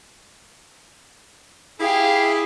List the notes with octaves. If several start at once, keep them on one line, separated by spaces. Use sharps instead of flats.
E4 G4 G#4 F5